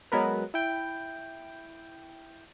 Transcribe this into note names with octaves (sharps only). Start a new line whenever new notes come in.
F#3 G#3 B3 A#4 B4
E4 G5